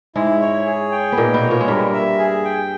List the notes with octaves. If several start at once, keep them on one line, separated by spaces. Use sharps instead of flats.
G#2 G#3 E4
C#5
G#4
G5
B3
A#2 A#3 D#4
B2 B3
C#5
A#2 A#3
G#3
G2 G3 A#4
E5
G#4
G5